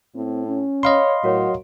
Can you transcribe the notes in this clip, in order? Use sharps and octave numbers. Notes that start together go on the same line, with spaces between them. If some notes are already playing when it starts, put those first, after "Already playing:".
A2 C4
C#4
C#5 D#5 F5 B5 C6
A2 F#3 F#4 A#4 C#5